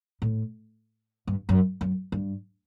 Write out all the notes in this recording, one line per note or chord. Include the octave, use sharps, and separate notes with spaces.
A2
G2
F#2
F#2
G2